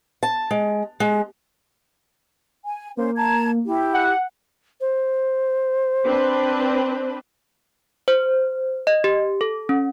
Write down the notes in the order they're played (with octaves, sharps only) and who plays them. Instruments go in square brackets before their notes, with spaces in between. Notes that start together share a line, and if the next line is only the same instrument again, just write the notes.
[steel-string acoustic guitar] A5
G#3
G#3
[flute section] G#5
[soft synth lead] A#3 [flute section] C#4 C5
[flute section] A5 A#5 G#6
E4 G4
[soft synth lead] F#5
[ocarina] C5
[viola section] C4 D4 B4
[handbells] C5
D#5
G4
A4
C#4